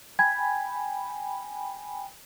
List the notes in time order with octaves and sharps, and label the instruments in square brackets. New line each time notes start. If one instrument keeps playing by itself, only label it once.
[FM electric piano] G5 G#5 B5 [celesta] G#6